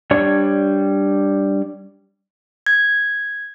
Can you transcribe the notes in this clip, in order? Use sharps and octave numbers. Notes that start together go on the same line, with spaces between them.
G3 D4 C#5 C#6
G#6